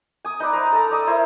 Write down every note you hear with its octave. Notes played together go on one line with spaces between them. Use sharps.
G#5 D#6
D#4 B4 D5
C5 A#5
A4 A5 A#5
D5 D#6 E6
E4 A#4 C5 E5